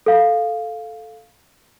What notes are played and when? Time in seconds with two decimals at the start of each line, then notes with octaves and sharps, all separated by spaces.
0.06 A4 F5